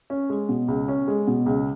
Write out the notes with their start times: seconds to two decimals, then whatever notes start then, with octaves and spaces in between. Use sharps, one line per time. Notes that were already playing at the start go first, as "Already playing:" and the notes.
0.10 C#4
0.30 G#3
0.49 B2
0.68 C#2
0.88 C#4
1.08 G#3
1.27 B2
1.46 C#2